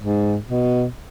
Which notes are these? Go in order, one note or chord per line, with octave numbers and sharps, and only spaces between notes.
G#2
B2